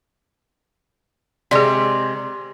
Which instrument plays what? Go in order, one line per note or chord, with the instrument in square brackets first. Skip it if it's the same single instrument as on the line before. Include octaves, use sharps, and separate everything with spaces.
[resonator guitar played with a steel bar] C3 G#3 [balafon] G#4 D5